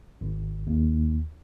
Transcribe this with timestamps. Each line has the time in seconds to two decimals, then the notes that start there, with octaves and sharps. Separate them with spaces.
0.21 G#1
0.67 D#2